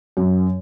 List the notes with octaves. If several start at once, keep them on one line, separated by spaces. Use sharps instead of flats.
F#2